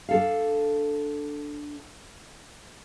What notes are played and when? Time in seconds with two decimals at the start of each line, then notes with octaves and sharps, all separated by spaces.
0.09 D4 A4 F5